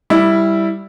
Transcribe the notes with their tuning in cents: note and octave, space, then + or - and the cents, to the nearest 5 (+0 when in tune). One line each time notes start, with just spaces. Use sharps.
G3 +0 E4 +0